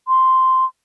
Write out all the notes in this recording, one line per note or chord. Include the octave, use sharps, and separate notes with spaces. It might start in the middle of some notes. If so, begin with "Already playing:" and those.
C6